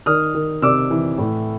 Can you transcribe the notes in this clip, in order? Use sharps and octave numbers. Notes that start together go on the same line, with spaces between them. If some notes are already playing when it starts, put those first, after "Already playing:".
D#3 D#6 F6
D#3
C3 D6 E6
E3
A2